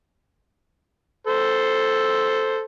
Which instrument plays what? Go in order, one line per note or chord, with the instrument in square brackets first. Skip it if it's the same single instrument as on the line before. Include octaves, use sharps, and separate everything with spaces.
[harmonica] A4 C5